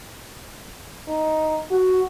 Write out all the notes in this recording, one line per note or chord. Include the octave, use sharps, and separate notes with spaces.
D#4
F#4